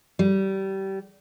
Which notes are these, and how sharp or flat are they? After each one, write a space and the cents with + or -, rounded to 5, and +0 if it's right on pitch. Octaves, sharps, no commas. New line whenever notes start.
G3 -25